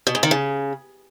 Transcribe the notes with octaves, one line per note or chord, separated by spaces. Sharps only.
B2
G#2
D#3
C#3